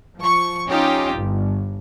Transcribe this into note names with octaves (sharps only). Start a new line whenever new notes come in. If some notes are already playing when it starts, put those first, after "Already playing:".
F3 C#6
C#4 D#4 F4 G4
G1